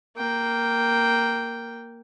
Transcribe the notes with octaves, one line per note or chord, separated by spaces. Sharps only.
A#3 G5